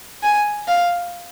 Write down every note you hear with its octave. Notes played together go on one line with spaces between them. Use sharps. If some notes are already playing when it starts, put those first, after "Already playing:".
G#5
F5